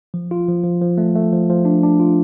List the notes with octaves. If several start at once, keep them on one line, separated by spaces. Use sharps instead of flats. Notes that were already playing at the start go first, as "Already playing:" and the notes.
F3
F4
F3
F3
F3
A3
A3
F3
F3
D4
D4
F4